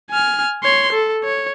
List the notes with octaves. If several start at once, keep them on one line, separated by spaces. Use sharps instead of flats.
G#5 F6
C#5 C6
A4
C#5